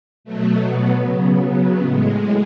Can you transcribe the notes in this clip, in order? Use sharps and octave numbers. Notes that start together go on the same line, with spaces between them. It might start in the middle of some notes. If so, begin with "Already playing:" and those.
B2 F#3 A3
B3
C#3 F#3 B3
B3
A2 G#3